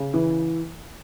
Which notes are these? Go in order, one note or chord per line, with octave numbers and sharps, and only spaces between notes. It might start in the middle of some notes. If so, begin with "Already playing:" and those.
Already playing: C#3
E3